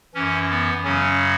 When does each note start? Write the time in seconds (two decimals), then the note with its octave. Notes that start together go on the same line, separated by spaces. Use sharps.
0.15 F#2 E3 C#4
0.50 B3
0.84 F#2 C#3 F#3 C#4